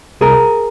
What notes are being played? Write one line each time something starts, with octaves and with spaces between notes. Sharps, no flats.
C2 G#4 A#4